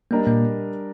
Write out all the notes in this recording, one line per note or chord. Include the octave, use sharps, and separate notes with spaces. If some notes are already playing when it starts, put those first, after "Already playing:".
G3 A#3 D4 G4 A#4 D#5
A#2 A#3